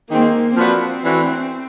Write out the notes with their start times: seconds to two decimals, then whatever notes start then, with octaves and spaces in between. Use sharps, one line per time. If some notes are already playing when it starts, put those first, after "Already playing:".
0.10 D#3 G#3 A#3 C4
0.57 F3 A#3 C4 D4 F#4 B4
1.04 E3 A3 D4 F#4